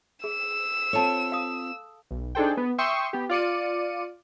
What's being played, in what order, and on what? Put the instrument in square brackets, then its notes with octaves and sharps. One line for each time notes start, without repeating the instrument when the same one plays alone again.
[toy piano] G#4 [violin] E6 E7
[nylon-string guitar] C4 F4 C#5 [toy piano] A4 A5
[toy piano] F5 D#6
[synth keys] B1
D4 D#4 G#4 A4 C5 G5
B3
E5 G5 C6 C#6 D#6 E6
B3 G4
F4 D5 C#7 D#7